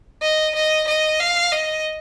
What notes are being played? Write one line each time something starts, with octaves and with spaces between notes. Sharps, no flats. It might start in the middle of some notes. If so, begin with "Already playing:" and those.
D#5
D#5
D#5
F5
D#5